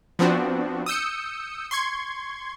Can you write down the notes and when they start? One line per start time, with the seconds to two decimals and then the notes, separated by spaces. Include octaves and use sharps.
0.19 F3 B3 C4 D4 F#4
0.86 D#6 E6 G6 C#7
1.71 C6 C#6 G#6